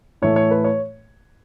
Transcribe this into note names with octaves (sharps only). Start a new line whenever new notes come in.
A2 E3 A3 C#5
C#5
B4
C#5